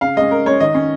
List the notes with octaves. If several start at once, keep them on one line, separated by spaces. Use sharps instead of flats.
C#3 F5
G#3 C#4 D#5
C#3 A#4
G#3 C#4 C#5
D#3 D#5
C#4